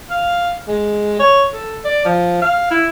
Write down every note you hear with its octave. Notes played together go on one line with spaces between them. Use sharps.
F5
G#3
C#5
A4
D5
F3
F5
E4